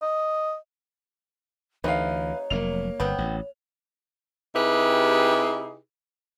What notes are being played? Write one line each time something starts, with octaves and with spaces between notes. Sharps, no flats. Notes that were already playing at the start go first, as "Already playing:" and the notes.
D#5
D2 C3 E3 A3 D#4 B4 C#5 F5
F1 A2 F#3 A#3 F7
G1 B3 C4 G5
A1
C3 D#4 E4 G4 G#4 B4